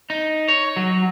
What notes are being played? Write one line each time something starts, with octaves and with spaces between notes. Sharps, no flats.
D#4
C#5
F#3